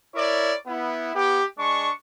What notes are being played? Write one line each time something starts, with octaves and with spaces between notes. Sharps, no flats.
E4 A#4 C#5 D5
B3 E4
B3 E4 G4
G#3 D4 C#6